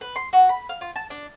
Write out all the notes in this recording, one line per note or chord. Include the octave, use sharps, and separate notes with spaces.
B4
C6
F#4
B5
F5
F4
A5
D4